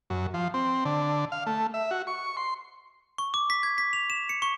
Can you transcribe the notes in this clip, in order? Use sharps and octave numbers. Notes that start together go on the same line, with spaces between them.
F#2
F3
C4
D3
F5
A3
E5
F#4
C#6
C6
C#6
D6
B6
G#6
B6
F7
E7
C#7
C#6